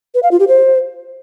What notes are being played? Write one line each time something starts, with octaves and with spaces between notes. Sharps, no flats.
B4
F5
F4
G4
C5